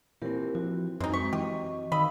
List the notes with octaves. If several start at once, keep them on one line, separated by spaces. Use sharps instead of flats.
A#2 E3 C4 G4 A#4
F3 F#4
F#2 F#3 G#3 C4 D#4 G#5
G#3 C#6
E3 G4 D#5 C#6
D#3 D#5 F5 B5 E6